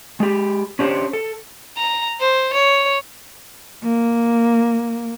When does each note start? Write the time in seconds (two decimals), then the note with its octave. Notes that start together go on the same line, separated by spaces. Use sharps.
0.20 G#3 G4
0.79 C#4 D4 G4 A4 C5 C#5
1.13 A4
1.77 A#5
2.20 C5
2.54 C#5
3.82 A#3